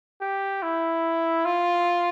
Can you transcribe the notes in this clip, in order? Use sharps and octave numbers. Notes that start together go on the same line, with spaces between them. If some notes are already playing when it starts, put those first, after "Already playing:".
G4
E4
F4